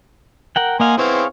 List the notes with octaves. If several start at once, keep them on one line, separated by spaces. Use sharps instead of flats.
A#4 F#5 G5
A#3 D#5 F5 F#5 G#5 C6
B3 C4 E4 G#4 C#5 F5